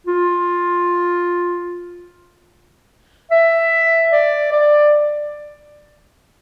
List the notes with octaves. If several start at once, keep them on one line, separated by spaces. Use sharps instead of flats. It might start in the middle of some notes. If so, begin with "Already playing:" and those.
F4
E5
D5
D5